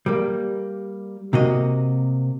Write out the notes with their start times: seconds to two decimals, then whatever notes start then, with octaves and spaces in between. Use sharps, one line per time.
0.06 G3 A#3
1.33 C3 A#3 F#4 D#5